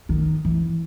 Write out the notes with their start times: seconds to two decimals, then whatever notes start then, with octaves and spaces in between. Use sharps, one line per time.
0.09 D#3
0.45 E3